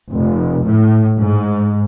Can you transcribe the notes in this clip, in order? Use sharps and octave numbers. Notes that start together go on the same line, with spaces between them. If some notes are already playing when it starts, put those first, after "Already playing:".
F1
A2
G#2